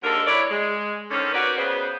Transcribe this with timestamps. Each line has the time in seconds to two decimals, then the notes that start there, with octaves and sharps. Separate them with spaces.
0.03 D#2 D3 G#3 A4 A#4
0.26 F#3 E4 B4 C#5 D5
0.51 G#3
1.11 D3 D#3 C4 C#4
1.33 C#4 F#4 G4 A#4 B4 D5
1.57 C#3 B3 C5